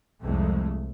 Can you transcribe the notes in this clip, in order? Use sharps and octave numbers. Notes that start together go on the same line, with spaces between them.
C2 F2 G#3 A3